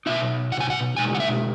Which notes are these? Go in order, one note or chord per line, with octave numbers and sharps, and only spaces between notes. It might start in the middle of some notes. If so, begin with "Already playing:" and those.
B2 G#3 D#4 E5
F#5
G#5
F#5
B2 G#3 D#4 G#5
F#5
E5